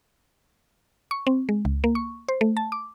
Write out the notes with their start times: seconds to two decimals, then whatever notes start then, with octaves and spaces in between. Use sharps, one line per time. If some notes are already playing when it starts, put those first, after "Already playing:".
1.11 C#6
1.27 C4
1.49 G#3
1.65 C#2
1.84 A#3
1.95 C#6
2.28 C5
2.41 A3
2.57 A5
2.72 D6